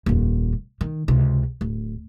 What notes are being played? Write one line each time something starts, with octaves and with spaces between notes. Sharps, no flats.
D#1 F2
D#3
C#2 C3
D1